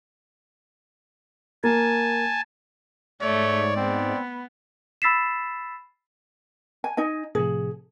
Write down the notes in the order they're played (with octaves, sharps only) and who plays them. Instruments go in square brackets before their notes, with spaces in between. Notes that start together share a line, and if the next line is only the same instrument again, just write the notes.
[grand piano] A#3 [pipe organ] G#5 A5
[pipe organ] G#2 [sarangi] A3 [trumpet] C#5 [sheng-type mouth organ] D5
[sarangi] B3 [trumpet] C4
[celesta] B5 E6 A6 B6 C7 E7
[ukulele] G#5
D#4 D#5 G#5
[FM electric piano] A2 C3 F3 [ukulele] G#4